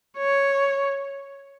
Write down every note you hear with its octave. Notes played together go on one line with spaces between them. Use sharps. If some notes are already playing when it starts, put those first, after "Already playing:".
C#5